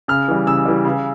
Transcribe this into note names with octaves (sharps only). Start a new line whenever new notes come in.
C#3 F6
E3 G3
C#3 E6
E3 G3
C#3